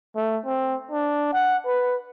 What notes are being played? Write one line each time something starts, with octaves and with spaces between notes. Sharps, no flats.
A3
C4
D4
F#5
B4